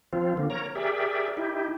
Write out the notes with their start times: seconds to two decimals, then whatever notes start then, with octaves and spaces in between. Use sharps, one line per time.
0.13 F3 C4 F4
0.37 D3 A#3
0.50 A#4 C#5 A#5
0.75 G4 G#4 A#4 D5 E5
1.37 D#4 E4 G4